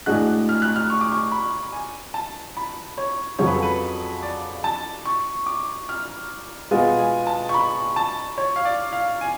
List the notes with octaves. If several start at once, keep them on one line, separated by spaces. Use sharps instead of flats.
A2 G#3 D4 F#4 F#6
F6
F#6
F6
C#6
D6
C#6
B5
G#5
A5
B5
C#5
F2 C#3 F#3 C#5
B4
A4
B4
D5
A5
C#6
D6
F6
B2 G#3 B3 F4 G#5
G#5
A5
C#6
B5
A5
C#5
F5
D5
F5
G#5